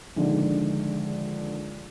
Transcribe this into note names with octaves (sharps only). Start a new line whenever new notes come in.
A#1 D3 D#3 G#3